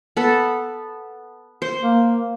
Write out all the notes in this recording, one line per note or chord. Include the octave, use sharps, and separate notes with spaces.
B3 A4
C5
A#3